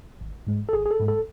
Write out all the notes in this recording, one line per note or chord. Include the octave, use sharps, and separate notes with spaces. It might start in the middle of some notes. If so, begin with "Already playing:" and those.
G#1
G#2 G#3
A4
G#1 G#4
G#4
A4
G#2 G#3
A4